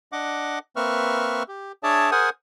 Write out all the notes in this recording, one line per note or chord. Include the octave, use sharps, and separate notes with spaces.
D4 D#5 F#5 D6
A#3 C4 B4 E5 C#6 F6
G4
D4 G#4 C#5 D5 E5 A5
G#4 A#4 C5 F#5 G#5 D#6